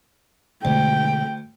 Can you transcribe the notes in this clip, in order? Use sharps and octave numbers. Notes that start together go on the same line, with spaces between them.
D2 B2 D3 G#3 G5